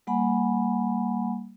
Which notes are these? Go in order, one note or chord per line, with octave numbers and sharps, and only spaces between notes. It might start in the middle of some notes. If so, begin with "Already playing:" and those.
G3 A#3 F#5 G#5 B5